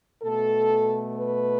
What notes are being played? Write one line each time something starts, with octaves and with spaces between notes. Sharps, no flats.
B2 A3 A4
B4